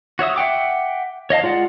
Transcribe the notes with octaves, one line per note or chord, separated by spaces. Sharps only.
F#4 C#5 E5 D#6
E5 F#5 G5 D6
C#5 D#5 F5 A5
G#3 F4 D5 F#5